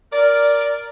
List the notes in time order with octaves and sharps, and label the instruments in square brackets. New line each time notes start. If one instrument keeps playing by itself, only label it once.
[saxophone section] A#4 D5